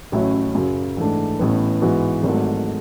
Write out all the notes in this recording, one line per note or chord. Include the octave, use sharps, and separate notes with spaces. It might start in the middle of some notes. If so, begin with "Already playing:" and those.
A1 A2 F#3 C#4 E4
F#2 C#3 F#3
G#2 E3 A3 D4
A1 A2 E3 B3
G#2 E3 B3 F#4
G#1 G#2 F#3 A3